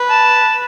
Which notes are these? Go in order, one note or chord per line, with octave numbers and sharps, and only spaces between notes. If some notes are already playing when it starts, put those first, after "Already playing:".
Already playing: B4
A5